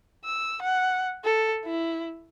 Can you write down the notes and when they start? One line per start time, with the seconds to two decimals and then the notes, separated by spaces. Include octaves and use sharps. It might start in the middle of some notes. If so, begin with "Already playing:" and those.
0.25 E6
0.62 F#5
1.24 A4
1.65 E4